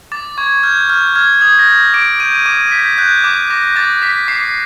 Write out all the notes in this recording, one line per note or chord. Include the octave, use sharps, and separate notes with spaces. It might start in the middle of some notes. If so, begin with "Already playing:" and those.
D6 A6
C#6 G#6
F6 G6
F6 G6
F6 G#6
D#6 G#6
A#6
G6
D6 D7
G6 D#7
D6 D#7
G6 B6
F#6 G6
D6
D6 A#6
D6 A6
D6 B6
D6 C7